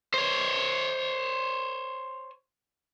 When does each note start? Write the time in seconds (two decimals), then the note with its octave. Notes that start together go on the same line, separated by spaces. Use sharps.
0.14 C5 C#5